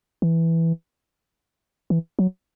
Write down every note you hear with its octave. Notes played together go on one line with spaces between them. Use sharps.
E3
E3
F#3